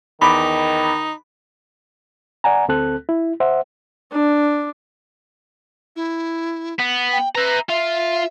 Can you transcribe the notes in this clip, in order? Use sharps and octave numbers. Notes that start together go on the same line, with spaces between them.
E2 D#3 D#4 B5 D6
D5 F#5 G#5 A#5
D2 C4 A4 F#6
E4
C5 E5 F#5
D4
E4
B3
G5
B4 E5 A#5
F4 E5